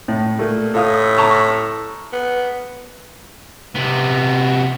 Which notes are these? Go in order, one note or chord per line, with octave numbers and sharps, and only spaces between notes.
A2
A#2 A3
A2 A4 F5 D#6
A5 A#5 C#6
B3
C3 B3